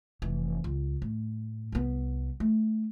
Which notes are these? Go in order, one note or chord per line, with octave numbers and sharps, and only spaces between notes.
F1 E3
C#2
A2
C2 B3
A3